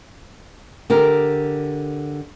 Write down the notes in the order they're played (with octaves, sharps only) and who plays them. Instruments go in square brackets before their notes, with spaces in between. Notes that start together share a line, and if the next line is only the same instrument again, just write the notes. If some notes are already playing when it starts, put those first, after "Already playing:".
[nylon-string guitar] D3 G4 A#4